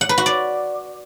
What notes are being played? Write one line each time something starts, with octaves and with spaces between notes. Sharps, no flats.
F#5
B4
F#4
D5